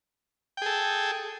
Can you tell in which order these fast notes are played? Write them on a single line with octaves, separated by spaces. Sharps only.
G5 G#4 A4